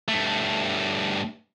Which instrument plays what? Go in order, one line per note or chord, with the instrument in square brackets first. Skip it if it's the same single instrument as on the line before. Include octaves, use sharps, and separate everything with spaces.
[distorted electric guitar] G2 A3